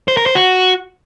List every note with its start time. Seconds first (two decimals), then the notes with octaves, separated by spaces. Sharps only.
0.08 C5
0.17 A#4
0.26 C5
0.35 F#4